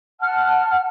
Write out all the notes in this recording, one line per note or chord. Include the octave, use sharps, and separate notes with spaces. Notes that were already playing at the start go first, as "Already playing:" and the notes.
F#5 A5 F6